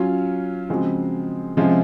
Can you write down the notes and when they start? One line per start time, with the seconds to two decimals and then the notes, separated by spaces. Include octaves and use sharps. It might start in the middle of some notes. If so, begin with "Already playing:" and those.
Already playing: F#3 C#4 F4
0.69 C#3 F3 G#3 C4 F#4
1.57 C3 F3 G#3 C#4 F4